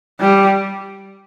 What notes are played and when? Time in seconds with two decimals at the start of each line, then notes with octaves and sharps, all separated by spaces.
0.20 G3